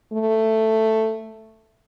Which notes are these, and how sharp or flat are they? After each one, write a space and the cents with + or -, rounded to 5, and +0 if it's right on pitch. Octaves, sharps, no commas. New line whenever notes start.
A3 +5